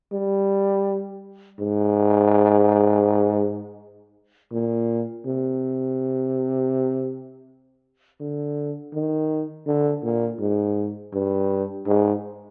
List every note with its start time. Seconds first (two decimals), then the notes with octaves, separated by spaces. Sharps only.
0.12 G3
1.59 G#2
4.53 A#2
5.27 C3
8.20 D3
8.93 D#3
9.67 D3
10.04 A#2
10.39 G#2
11.13 G2
11.87 G#2